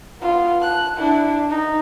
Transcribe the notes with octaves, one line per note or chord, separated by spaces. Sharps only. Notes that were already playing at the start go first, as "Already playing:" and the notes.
B3 F4
A5 F#6
D4 E4
D#4